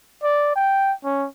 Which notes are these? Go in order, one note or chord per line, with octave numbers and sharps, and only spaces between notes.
D5
G5
C#4